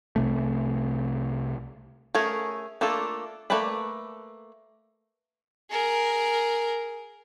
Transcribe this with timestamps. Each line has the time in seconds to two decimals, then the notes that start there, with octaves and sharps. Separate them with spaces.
0.16 C2 C3 A3
2.14 A3 C#4 G#4 A#4
2.81 A3 A#3 D4 F4 A4
3.50 A3 A#3 B4 D5 B5
5.71 G#4 A#4